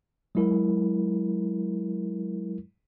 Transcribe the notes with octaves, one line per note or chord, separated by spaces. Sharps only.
F#3 G#3 E4 A#4